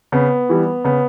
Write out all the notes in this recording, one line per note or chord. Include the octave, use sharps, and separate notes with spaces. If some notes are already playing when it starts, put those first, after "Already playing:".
C#3 B3
E3 G3
C#3 B3